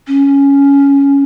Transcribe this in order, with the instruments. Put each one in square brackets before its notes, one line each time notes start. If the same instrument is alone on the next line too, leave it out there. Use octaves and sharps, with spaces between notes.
[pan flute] C#4